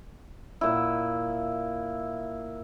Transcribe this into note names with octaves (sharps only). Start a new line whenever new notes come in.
A#2 E4